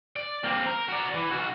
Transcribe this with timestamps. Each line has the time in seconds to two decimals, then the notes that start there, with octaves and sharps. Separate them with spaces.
0.16 D5
0.44 A#3 C4
0.66 A#4
0.88 F#4 D5
1.14 E3
1.30 B1 F#4